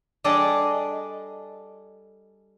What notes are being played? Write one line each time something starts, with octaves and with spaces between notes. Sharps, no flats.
G3 D4 G#4 A4 D5 D#5